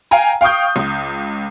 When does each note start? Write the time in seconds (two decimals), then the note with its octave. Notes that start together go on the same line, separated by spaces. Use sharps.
0.11 F5 G5 G#5 A#5
0.41 F5 G5 C#6 D#6 G6
0.76 C#2